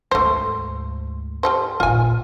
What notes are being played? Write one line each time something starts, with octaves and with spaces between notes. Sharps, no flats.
D2 G#2 A3 C5
G3 A4 C5
A1 A#2 F4 G#5